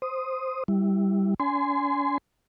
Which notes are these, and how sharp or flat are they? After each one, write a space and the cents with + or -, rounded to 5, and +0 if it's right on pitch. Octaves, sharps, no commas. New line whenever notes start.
C5 +0 D#6 +0
G3 +0 E4 +0
C#4 +45 G#5 +10 C6 -25